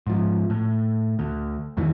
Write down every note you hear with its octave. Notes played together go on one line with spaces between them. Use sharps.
G#2 F3
A2
D2
E2 G2 D#3 E3